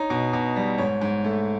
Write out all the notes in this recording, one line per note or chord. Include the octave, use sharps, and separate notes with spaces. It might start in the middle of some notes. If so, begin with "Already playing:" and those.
Already playing: D#4 C#5
B2
B2
G3
G#2 C#5
G#2
A3